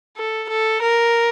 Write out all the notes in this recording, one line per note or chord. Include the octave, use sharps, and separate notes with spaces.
A4
A4
A#4